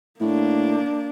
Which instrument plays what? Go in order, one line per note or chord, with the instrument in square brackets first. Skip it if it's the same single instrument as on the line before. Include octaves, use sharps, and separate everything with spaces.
[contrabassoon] A2 [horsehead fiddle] A#3 D4